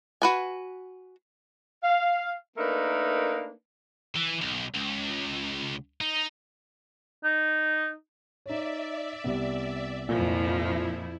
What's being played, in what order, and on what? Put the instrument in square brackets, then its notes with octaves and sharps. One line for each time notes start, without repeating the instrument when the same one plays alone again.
[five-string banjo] F#4 B4 G#5
[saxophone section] F5
A3 A#3 D4 D#4 A#4 B4
[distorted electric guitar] E3
B1
C#2
D#4
[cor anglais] D#4
[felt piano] D#4 C#5 [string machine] D5 E5
[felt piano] C2 C3 B3
[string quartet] F2 F3 [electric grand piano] A#2 [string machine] E4